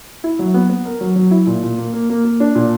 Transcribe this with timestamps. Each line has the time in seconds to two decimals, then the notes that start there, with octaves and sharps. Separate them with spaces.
0.24 E4
0.39 F#3
0.54 B3
0.70 B3
0.85 A#4
1.01 F#3
1.16 F#3
1.31 E4
1.47 A#2
1.63 A#2
1.78 A#3
1.93 A#3
2.10 A#3
2.25 A#3
2.40 D4
2.55 A#2